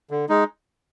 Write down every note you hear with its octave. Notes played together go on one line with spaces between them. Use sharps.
D3
G#3 D#4